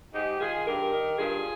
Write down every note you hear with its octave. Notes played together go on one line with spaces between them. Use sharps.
G#2 D#4 G4
D#3 F4 G#4
G2 G4 A#4
D#3
G2 F4 G#4